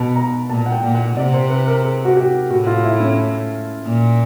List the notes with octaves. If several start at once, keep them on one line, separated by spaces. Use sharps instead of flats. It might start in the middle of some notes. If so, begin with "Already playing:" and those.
Already playing: B2 A5
A#5
A#2 A5
F#5
G5
A#2
F#5
C3 D5
C5
B4
A#4
G#4
F#4
G4
A2 F#4
F4
E4
C#4
A#2